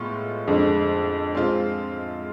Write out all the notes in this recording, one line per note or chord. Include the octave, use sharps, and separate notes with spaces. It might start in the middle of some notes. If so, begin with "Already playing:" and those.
Already playing: A2 G#3 B3 F4
F2 D3 G#3
G#3 C4 F4